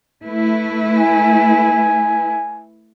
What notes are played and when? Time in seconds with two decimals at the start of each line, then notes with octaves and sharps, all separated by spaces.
0.24 A3 E4 B4
0.98 G#5